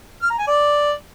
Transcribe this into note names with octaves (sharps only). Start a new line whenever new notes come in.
F6
A#5
G#5
D5